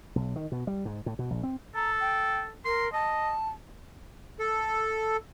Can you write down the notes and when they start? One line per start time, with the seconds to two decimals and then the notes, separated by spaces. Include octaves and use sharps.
0.16 B1
0.36 D#3
0.52 B2
0.67 G3
0.85 G#2
1.06 A2
1.19 B2
1.30 A#1
1.43 C4
1.75 A4 A#5
2.00 G5
2.65 A#4 C6
2.93 D#5 A5
4.39 A4